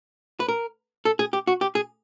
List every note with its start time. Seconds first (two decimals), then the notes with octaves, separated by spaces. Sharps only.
0.40 B4
0.49 A#4
1.05 A4
1.19 G#4
1.33 G4
1.47 F#4
1.61 G4
1.75 G#4